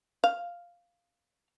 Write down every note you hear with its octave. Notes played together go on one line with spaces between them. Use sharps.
F5